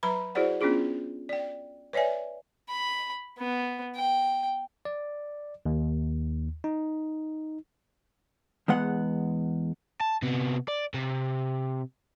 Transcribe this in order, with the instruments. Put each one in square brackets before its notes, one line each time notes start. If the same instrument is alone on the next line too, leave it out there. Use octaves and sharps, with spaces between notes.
[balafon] F#3 B4 A#5 B5
E4 F#4 G#4 C5 D5 F#5
B3 C#4 D4 F4 G#4
D5 G5
B4 C#5 D5 E5 G#5
[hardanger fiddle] B5
B3
G5
[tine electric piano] D5
D#2
D#4
[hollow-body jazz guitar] E2 G#3 B3 F#5
[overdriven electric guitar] A5
C3 B3
D5
C3